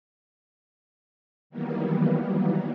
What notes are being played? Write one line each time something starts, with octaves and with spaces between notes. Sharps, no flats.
D#3 E3 F#3 G3 A#3 B3